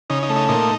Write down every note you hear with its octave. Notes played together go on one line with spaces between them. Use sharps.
C#3 D#4
D#4
A3
D#4
A#2 D#4